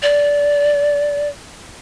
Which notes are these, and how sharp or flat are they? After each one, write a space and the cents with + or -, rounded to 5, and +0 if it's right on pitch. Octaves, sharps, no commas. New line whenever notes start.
D5 -20